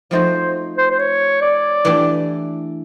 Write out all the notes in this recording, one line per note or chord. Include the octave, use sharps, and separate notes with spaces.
F3 A3 C4 D#4 F#4 C5
C5
C5
C#5
D5
E3 A3 D4 G4